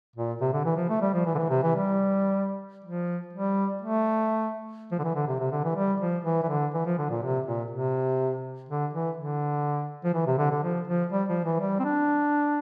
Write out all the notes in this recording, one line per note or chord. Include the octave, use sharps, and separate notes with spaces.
A#2
C3
D3
E3
F3
A3
G3
F3
E3
D3
E3
C3
E3
G3
F3
G3
A3
F3
D3
E3
D3
C3
C3
D3
E3
G3
F3
E3
E3
D3
E3
F3
D3
A#2
C3
A#2
C3
D3
E3
D3
F3
E3
C3
D3
D3
F3
F3
G3
F3
E3
G3
C4
D4